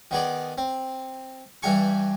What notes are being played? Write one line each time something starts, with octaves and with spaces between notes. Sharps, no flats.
D#3 B3 G#4 D5
C4
G2 E3 G3 G4 G#5 C#6